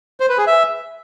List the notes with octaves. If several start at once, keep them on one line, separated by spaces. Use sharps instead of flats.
C5
B4
G#4
E5